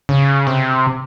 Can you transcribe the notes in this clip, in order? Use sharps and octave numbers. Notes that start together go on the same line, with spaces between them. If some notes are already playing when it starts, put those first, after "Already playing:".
C#3
C3